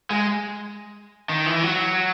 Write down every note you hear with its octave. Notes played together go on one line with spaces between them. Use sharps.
G#3
D#3
E3
F#3